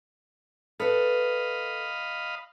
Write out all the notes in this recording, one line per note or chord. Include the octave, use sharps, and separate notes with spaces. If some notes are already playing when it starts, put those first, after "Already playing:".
A4 B4 D#5 F5 B5